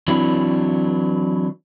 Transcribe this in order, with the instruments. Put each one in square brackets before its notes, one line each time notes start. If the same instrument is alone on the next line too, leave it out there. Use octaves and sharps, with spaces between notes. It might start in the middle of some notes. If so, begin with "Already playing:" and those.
[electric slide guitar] E3 F#3 C4 D4 E4